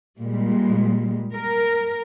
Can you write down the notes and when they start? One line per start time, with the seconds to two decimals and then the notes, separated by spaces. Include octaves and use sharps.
0.20 A#2 G3 G#3
1.32 A#4